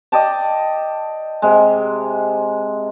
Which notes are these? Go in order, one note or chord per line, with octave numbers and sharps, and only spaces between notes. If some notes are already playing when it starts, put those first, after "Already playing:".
D5 D#5 G5 A5
C3 G#3